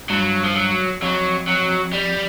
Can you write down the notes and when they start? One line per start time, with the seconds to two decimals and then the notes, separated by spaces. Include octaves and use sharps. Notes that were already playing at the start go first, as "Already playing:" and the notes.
0.10 G2 F#3
0.44 F3
0.55 F#3
1.02 F2 F#3
1.48 F#3
1.94 G3